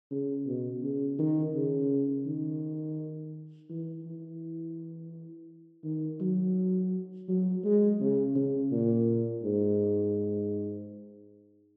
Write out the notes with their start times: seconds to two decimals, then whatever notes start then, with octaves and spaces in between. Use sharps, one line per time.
0.11 C#3
0.46 B2
0.83 C#3
1.19 D#3
1.54 C#3
2.26 D#3
3.70 E3
4.06 E3
5.84 D#3
6.21 F#3
7.29 F#3
7.64 G#3
8.00 C#3
8.35 C#3
8.71 A#2
9.43 G#2